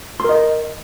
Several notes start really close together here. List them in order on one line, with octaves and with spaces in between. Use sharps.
C6 A#4 D#5